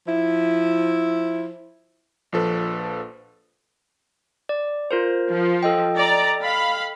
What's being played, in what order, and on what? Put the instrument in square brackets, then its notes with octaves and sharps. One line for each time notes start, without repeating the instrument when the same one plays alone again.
[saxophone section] F3 E4
[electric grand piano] A#1 F3 A4 B4
[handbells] D5
F4 A#4 C5
[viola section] F3
[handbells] A4 D#5 G5
[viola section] D5 A#5
F5 B5